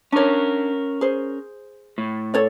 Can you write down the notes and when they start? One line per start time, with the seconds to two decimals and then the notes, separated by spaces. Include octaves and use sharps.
0.12 C#4 D4 A#4 C#5
1.01 G#4 C5
1.98 A2
2.34 A4 C#5 D5